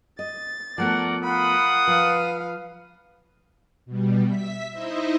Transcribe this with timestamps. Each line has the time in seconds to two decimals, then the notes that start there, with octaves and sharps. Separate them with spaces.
0.19 D#5 A6
0.78 F3 A3 B3 A#4 D5 F#5
1.23 F4 A#4 F#5 B5 D#6
1.87 F3 B4 F5
3.85 B2 G3
4.25 E5 B6
4.70 D#4 E4 C5 D#5 E5